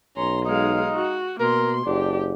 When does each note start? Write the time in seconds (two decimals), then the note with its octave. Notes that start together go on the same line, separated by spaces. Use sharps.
0.17 B1 C#4 A#5 C6
0.45 G#3 D#4 F5
0.95 F#4
1.40 B2 A#3 A#4 C6
1.86 F#1 D4 G4